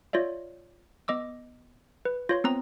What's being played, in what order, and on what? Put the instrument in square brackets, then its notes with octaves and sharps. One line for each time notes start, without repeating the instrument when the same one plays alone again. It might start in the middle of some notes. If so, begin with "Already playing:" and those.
[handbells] F4 C#5 D5 E5
B3 D#5 D6 E6
B4
F4 C#5 C6
B3 C4 A#5 D#6